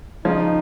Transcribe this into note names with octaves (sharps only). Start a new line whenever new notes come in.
C#3 F3 D#4